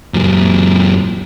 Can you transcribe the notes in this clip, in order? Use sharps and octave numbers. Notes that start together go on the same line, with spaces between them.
F#2 A#2